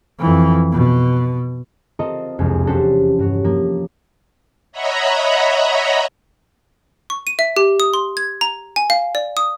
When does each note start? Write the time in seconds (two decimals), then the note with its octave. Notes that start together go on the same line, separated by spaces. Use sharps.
0.19 F2 E3
0.72 B2
1.99 C4 F4 A4 A#4 C5 D#5
2.39 E1 C2 F2 G#3
2.67 C#4 D4 F#4 G4 A4 C5
3.19 G2 F#4 C#5
3.44 F3 A#3
4.72 C#5 D#5 E5 F#5 A#5 B5
7.10 C#6
7.27 D#7
7.39 E5
7.57 G4
7.80 D#6
7.94 C6
8.17 G#6
8.41 A#5
8.76 G#5
8.90 F5
9.15 D5
9.37 D#6